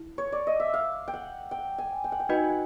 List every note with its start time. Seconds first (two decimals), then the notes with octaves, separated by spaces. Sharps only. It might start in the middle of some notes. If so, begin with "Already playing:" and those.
Already playing: E4
0.18 C#5
0.32 D5
0.47 D#5
0.60 E5
0.74 F5
1.08 G5
1.14 F#5
1.51 G5
1.78 G#5
2.04 G5
2.12 F#5
2.20 G5
2.29 D#4 F#4 B4 D#5 F#5 G#5
2.49 F#5